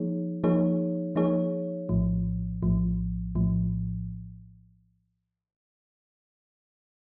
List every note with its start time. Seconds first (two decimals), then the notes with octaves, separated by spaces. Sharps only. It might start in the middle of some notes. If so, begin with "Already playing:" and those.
Already playing: F3 A#3 D#4 G#4 C#5
0.44 F3 A#3 D#4 G#4 C#5
1.15 F3 A#3 D#4 G#4 C#5
1.89 A#1 A2 F3
2.63 A#1 A2 F3
3.35 A#1 A2 F3